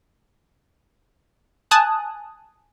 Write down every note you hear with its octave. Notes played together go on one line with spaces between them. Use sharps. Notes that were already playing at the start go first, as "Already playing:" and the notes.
G#5 A5 D#6 F#6